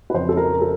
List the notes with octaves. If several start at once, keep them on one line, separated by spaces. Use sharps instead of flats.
B4
F2 C#3 F3 C5
A4
A#4
A4